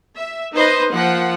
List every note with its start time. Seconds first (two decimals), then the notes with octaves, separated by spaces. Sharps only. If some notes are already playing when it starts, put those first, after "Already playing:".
0.17 E5
0.54 D#4 B4 C5 D#5
0.92 F3 A#3 F#5